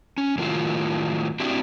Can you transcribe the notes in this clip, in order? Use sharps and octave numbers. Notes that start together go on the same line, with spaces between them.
C#4
A2 D#3 F#3 F4
C4 D4 E4 F#4 G4